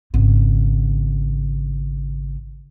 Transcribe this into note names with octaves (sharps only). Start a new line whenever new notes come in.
G#1 C#3